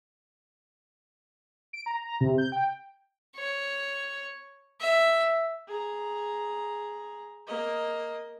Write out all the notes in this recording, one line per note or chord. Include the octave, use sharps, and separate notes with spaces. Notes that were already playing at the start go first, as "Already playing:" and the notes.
D7
A#5
A#5
C3
G6
G5
C#5
E5
G#4 A#5
A#3 D#5